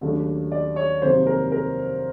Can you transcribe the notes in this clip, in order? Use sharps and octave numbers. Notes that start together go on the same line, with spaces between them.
D#2 C#3 F#3 A3 D4
D5
C#5
F2 C3 D#3 F#3 A#3 C5
A#4
A#4